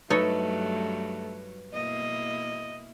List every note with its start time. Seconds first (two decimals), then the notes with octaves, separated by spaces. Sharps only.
0.10 G2 F#3 A3 D#4 A4 B4 C#5
1.73 B2 A#3 E4 D#5